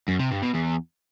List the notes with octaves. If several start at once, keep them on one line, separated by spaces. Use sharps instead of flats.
F#2
C3
G2
B2
E2